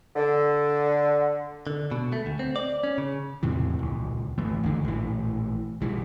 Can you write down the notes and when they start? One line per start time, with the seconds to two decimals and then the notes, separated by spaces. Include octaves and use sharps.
0.15 D3
1.67 D3
1.91 B2
2.12 A3
2.26 D2
2.39 C4
2.56 D5
2.84 C#4
2.98 C#3
3.43 E2 A2 C3 E3
3.79 D#1 C#2
4.38 G#1 E3 A3
4.64 G1 D#2 D3
4.85 A#1 A2 E3
5.81 B1 E3 G3